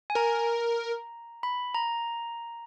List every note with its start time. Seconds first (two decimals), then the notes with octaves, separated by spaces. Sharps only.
0.10 G#5
0.15 A#4 A#5
1.43 B5
1.75 A#5